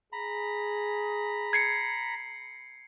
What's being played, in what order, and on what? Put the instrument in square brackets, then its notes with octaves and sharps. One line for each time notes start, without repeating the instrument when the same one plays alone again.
[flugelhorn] G#4 [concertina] A#5 B5
[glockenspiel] G#6 C7 C#7